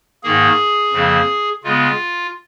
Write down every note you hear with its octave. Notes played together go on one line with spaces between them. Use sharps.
G#2 D#3 A#3 G#4
F2 C#3 F3 A#3
C#3 G#3 B3 F4